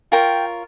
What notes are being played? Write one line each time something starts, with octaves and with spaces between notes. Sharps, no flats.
F4 A#4 C#5 G5